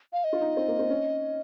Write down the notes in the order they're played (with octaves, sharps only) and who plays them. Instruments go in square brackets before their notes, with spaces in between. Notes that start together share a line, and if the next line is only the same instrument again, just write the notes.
[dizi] F5
D#5
[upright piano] F4
D#4
C4
A#3
C4
C#4